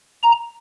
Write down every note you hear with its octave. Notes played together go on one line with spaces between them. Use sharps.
A#5